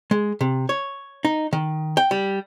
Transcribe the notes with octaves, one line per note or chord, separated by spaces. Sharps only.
G#3
C3
C#5
D#4
D#3
G5
G3